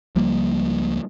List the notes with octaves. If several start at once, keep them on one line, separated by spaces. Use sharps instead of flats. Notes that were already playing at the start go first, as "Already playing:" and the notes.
C#2 F3 G3 A#3